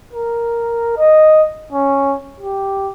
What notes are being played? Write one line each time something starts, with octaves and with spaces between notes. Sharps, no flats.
A#4
D#5
C#4
G4